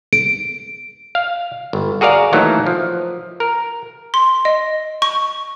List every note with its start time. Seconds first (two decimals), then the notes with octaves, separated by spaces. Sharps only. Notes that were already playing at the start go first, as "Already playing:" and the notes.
0.13 D7
1.15 F5
1.73 G1
2.01 F#4 G#4 A#4 D5 F5
2.33 D#3 E3 F#3 A3 A#3 D#4
2.67 F3
3.40 A#4
4.14 C6
4.45 D#5
5.02 C#6